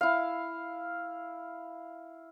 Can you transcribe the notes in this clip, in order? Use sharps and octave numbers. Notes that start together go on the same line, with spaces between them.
E4 F5